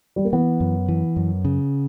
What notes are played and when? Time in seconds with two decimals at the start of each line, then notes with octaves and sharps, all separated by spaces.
0.16 G3
0.25 A#3
0.33 E3 B3
0.60 F#2
0.88 E3
1.16 F#2
1.45 C#3